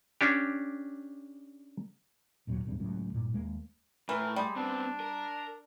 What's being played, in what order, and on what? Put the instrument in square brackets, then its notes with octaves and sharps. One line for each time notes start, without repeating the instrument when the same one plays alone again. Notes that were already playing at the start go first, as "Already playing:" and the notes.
[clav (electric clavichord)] C#4 D4 G4
[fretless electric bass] A1 D#2 A#2 F#3
D1 B1 E2 G2
C#2 F#2 A2
G2 A#2
D#2 G#3 A#3
[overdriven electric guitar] A2 [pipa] E3 [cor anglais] A#4
[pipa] G3 [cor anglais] G#3
[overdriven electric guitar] B3 C4 [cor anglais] D4
[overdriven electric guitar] A#4